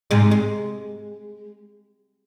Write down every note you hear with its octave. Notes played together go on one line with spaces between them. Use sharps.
G#2 C3 G#3
G#3